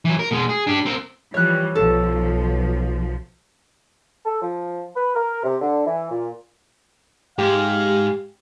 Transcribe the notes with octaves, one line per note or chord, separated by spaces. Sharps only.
E3 F#3
A#4
B2 G#3
G#4
D4 G4
C4 A#4
E3 F3 G3 C#5 F#6
B1 F3 A4
A4
F3
B4
A#4
C3
D3
E3
A#2
G#2 G#3 G4 F5